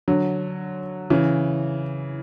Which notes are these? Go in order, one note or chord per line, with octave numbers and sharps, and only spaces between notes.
D3 F#3
C#3 E3